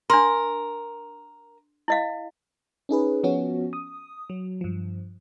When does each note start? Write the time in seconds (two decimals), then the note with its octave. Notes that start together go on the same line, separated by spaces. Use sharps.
0.10 D4 A#4 C6
1.88 E4 D#5 F5
2.89 C#4 D#4 G#4 B4
3.24 F3 B3 C#4 F#4
3.73 D#6
4.30 F#3
4.61 G2 F3